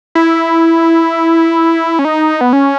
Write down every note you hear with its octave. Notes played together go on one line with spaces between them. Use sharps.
E4
C#4
D#4
B3
C#4